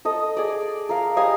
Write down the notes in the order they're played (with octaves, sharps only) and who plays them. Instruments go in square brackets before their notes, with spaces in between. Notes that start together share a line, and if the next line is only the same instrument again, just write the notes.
[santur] A4 D#5
G#4 D5
A#4 F5
G3 D#5 F5 G#5